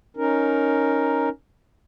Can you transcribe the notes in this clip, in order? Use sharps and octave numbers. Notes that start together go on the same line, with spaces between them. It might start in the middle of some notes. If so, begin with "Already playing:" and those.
C#4 D#4 A#4